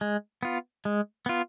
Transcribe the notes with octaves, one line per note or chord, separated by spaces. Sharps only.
G#3
B3 F4
G#3
B3 F4